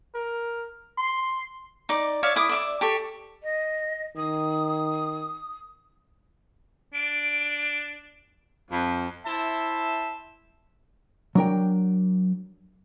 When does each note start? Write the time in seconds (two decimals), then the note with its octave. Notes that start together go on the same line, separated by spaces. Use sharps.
0.15 A#4
0.98 C6
1.89 D#4 D5 D6
2.23 C#5 D5 E5 F5
2.36 E4 D6 D#6
2.49 D5 E5 D6
2.81 G4 A4 C#6
3.43 D#5
4.17 D#3 D#6
6.94 D4 D7
8.71 F2
9.25 E4 C5 E5 A5
11.35 F#3 D4 A#4 G5